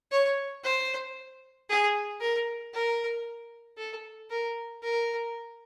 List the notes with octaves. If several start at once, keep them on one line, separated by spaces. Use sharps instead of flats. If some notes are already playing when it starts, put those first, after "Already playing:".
C#5
C5
G#4
A#4
A#4
A4
A#4
A#4